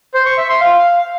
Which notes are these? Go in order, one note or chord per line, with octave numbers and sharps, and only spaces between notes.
C5
C#6
E5
C6
F5